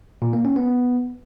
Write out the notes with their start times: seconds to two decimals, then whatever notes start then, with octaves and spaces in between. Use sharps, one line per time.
0.22 A#2
0.33 A#3
0.45 C#4
0.56 B3